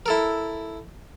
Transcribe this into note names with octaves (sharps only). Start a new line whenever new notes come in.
E4 A4 A#4